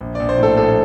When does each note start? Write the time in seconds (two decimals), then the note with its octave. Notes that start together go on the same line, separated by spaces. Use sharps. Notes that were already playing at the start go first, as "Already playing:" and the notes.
0.01 A#1
0.15 A#1 D5
0.29 C5
0.38 A2 A4
0.57 A#1 A4